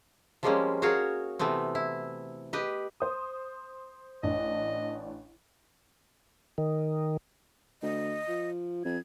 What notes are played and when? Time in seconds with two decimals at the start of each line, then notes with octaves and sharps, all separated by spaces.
0.43 F3 G3 G#3 A#3 C4 C#4
0.82 F#4 G#4 A#4 C#5 F5 F#5
1.39 C3 E3 A3 B3 C4
1.75 E4
2.53 G4 B4 D#5
3.00 C5 D#6
4.23 A1 D4 D#5
6.58 D#3
7.82 D2 D#5
8.28 F3
8.85 F2 G#6